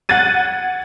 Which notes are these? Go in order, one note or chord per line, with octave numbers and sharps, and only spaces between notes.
F#5 F#6 G#6 A6 D#7